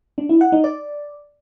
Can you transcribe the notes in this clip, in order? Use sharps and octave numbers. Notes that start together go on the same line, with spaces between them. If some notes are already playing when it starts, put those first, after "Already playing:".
D4
E4
F#5
D#4
D5